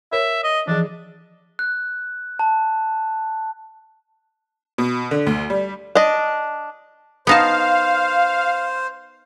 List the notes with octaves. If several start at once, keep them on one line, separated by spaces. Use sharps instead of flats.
A#4 C#5 E5
D#5
E3 F3 D4 G#4
F#6
A5
B2
D3
D2
G3
D4 D#5
B3 D#4 C5 F5 A5